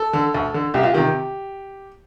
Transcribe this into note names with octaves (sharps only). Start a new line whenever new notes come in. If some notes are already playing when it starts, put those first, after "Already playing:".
Already playing: A4
D3
D2
D3
C2 G4
F4
C3 D#3 G4